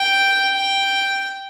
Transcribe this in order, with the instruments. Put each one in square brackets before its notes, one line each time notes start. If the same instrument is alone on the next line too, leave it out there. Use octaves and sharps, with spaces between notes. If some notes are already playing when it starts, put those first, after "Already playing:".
Already playing: [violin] G5
G5